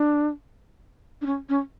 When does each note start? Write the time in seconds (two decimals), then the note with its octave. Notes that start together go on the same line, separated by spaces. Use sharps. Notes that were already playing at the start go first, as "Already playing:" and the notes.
Already playing: D4
1.21 D4
1.26 C#4
1.49 C#4